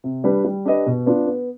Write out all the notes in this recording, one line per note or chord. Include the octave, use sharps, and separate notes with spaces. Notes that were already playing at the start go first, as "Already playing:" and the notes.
C3
G3 D4 G4 B4
G3
D4 G4 B4 D#5
B2
B3 D4 F4
B3